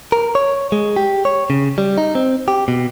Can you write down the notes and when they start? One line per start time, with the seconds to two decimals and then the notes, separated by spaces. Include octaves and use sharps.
0.12 A#4
0.35 C#5
0.72 G#3
0.96 G4
1.25 C#5
1.50 C#3
1.78 G3
1.98 D#4
2.15 C4
2.48 G4
2.68 B2